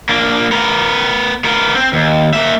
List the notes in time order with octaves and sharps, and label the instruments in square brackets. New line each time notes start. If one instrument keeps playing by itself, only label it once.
[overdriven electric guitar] A#3 D4
B3 A#4
B3 A#4
C4
D#2
A#3 E5